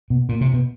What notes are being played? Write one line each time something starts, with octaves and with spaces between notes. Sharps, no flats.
B2
A#2
C3
B2